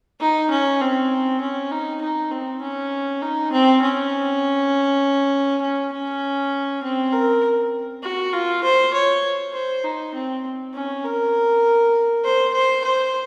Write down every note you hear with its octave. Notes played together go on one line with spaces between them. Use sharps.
D#4
C#4
C4
C#4
D#4
D#4
C4
C#4
D#4
C4
C#4
C#4
C#4
C4
A#4
F#4
F4
C5
C#5
C5
D#4
C4
C#4
A#4
C5
C5
C5